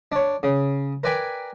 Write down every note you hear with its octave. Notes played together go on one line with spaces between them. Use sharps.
D4 C#5
C#3
A#4 B4 D5 G5 G#5 B5